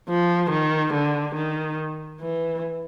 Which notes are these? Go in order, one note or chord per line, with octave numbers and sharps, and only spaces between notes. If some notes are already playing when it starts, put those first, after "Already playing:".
F3
D#3
D3
D#3
E3